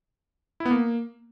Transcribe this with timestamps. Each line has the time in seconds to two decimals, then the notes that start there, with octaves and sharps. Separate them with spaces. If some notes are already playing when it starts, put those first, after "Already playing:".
0.60 E4
0.65 B3
0.71 A#3